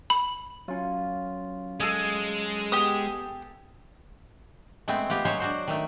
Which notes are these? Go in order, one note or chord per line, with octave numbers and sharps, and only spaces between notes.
B5
F#3 C#4 F4
G#3 G#4 A4
B3 G4 D#6
G#3 A3 B3 C4
B3 F4 G4
F#3 G#3 C5 C#5
D4 F#4 C5
D#3 A3